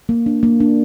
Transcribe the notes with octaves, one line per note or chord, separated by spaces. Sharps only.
A#3
D4
A#3
D4